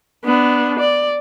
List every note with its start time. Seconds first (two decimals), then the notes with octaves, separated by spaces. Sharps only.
0.25 B3 D4
0.79 D5